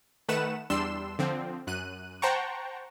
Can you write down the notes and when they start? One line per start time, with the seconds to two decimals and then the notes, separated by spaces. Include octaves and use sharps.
0.29 D#3 A3 B4 F#5 E7
0.70 E2 G3 D4 C6 E6 E7
1.19 D3 F3 C4
1.67 F#2 F#6 D#7
2.22 C5 F#5 G5 A5 A#5 C#6